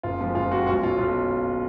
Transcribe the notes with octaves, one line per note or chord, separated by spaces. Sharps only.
F#1 F4
F2 F3 G#3
F#1 F4
F2 F3 G#3 F#4
B1 F#4
B2 F#3 F4
B1 F4